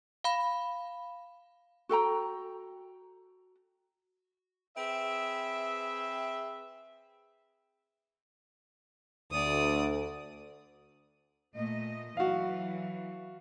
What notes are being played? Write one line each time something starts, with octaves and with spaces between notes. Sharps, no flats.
F5 B5
F#4 A4 G5 A#5
C4 G#4 B4 E5
D2 D5 D#6
A#2 A3 D#5
E3 F#3 F#4 F5